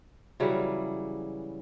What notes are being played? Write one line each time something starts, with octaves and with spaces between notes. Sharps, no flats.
C#3 E3 F#3 G3